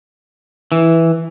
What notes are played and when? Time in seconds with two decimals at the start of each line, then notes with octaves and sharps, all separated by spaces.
0.72 E3